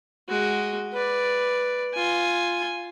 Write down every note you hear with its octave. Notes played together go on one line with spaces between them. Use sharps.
G#3 F#4
B4 D5
F4 G#5